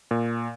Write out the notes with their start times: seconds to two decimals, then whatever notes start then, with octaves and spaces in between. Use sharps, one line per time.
0.11 A#2